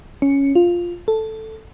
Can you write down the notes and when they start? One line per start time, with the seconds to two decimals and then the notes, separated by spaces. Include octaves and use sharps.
0.22 C#4
0.55 F4
1.08 A4